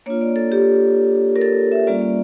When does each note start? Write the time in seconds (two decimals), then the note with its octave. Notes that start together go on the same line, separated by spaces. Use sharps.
0.06 A#3 D4 F4 C#5
0.21 D5
0.36 A4
0.52 G4
1.36 A#4
1.41 A4
1.72 E5
1.86 G3 A#3 C#4 F4 D5
2.01 D5